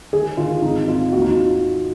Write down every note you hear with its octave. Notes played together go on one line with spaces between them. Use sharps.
D#3 G#4
D#3 F4
G#1 D#4
G#1 F4
D#2 F#4
D#4
F4